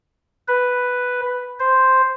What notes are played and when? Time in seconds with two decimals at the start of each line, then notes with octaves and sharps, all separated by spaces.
0.48 B4
1.59 C5